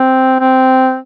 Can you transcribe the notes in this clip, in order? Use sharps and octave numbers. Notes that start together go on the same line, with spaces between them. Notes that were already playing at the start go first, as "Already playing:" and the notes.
Already playing: C4
C4